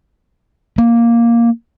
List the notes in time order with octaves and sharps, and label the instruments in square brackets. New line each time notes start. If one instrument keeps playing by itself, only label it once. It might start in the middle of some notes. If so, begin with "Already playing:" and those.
[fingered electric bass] A#3